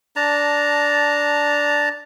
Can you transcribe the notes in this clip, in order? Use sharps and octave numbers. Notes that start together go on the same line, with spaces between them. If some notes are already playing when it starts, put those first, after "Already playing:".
D4 A5 A#5